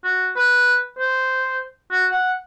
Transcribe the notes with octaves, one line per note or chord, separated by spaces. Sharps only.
F#4
B4
C5
F#4
F#5